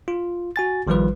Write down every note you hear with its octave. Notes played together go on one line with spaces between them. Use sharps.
F4
F#4 G#5 A6
A1 D#3 F3 G3 F4 B4